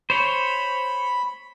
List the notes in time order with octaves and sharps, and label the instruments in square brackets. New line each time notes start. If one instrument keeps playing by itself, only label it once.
[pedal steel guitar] C5 C#5 [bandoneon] B5